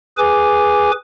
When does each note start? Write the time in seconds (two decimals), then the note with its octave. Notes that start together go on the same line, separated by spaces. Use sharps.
0.18 G#4 B4 G#5 D6